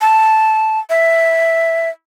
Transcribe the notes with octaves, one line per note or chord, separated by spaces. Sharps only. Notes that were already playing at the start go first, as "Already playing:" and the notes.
A5
E5